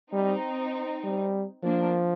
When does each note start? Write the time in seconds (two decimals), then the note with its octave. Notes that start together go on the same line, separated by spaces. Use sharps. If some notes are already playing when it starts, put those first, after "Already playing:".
0.12 G3 C4 D#4
1.04 G3
1.63 F3 A#3 D4